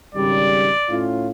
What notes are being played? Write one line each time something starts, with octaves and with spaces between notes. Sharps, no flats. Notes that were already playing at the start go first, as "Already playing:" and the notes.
G#1 C#3 G3 D5
A2 C#4 F4